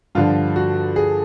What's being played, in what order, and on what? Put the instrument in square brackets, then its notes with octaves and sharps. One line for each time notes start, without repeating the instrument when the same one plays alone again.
[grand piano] G2 D3 F3 F4
F#4
G#4